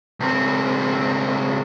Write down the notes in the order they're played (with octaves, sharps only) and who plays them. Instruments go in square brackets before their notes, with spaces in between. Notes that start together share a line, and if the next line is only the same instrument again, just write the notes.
[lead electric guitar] C#2 C4